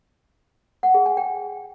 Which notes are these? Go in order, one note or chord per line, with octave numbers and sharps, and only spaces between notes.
F#5
G#4
G#5
G5